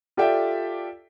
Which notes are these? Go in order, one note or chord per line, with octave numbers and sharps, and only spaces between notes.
F4 G4 A4 D5 E5 G5